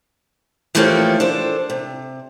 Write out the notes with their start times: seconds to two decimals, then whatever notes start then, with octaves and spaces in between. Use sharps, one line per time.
0.75 E3 F3 A3 A#3 C#4 G4
1.20 D4 A4 C5
1.70 C3